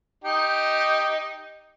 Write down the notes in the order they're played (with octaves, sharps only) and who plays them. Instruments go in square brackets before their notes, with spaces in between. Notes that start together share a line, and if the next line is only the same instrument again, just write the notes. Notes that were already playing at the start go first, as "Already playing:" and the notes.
[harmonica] D#4 G4